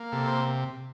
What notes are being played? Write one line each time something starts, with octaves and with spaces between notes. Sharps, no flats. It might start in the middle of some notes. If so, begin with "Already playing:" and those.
Already playing: A#3
C3 A4
C5